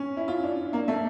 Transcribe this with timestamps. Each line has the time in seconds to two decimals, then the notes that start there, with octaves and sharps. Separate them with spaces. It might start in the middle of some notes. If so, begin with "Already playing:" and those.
Already playing: C#4
0.17 E4
0.28 F4
0.43 D4
0.73 A#3
0.88 A3